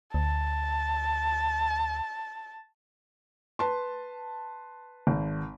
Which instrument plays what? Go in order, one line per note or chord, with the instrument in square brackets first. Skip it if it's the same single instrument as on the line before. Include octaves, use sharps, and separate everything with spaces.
[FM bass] D2 [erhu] A5
[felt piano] B4 A5 C6
[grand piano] G#1